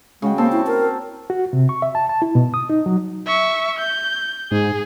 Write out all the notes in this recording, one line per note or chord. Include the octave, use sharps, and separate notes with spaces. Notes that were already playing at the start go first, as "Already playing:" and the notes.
C#3 G#3 F#4 G5
A#3 C4 A5
E4
A#4 A5
F#4
C3
C#6
E5
A5
A5
E4
B2
D#6
D#4
F#3
E5 C#6
G6
G#2 G#4